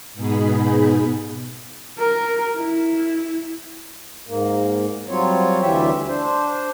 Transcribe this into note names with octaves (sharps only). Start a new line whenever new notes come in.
G#2 B2 B3 D#4 G#4 B5
A#4
E4
G#2 A#3
F#3 G3 C4 F4 C#5
D2 E3 G3 F4 G4 E5
D4 C5